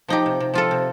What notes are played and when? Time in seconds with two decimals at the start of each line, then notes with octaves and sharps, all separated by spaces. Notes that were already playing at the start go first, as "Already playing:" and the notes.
0.08 F3 D#4 G4
0.26 C3
0.40 C3
0.54 F3 F4 A4
0.71 C3